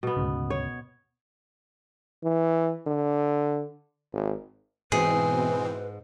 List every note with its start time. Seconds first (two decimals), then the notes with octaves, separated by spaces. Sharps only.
0.03 B2 B3
0.17 D2 G#2 C#3
0.50 C#5
2.24 E3
2.87 D3
4.13 G#1
4.92 G#2 B2 E3 C4 G#4 B4